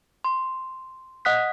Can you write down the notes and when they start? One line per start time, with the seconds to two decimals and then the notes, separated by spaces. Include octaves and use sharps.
0.25 C6
1.25 D#5 F#5 D#6 F#6 B6